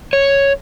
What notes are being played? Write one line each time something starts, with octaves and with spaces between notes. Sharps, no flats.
C#5